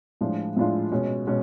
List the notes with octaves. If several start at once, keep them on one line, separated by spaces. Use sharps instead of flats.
A2 F3 G#3 D4 F4
A2 F3 G#3 D4 F4
B2 G#3 C#4
B2 G#3 C#4